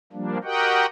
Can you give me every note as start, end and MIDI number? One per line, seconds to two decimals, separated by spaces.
0.13 0.38 53
0.13 0.38 55
0.13 0.38 58
0.13 0.38 62
0.44 0.86 66
0.44 0.86 67
0.44 0.86 70
0.44 0.86 75
0.44 0.86 78
0.44 0.86 79